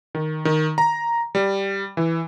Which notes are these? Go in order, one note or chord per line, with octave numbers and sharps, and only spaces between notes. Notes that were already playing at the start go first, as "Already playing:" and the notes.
D#3
D#3
A#5
G3
E3